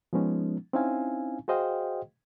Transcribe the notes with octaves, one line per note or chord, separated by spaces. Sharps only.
F3 G#3 B3 C#4 D#4
C4 C#4 D#4 E4 F5 G#5
F#4 G#4 C5 D#5 F5 G5